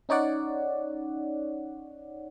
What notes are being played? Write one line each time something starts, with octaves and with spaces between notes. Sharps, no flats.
C#4 D#4 C#5 D5 F#5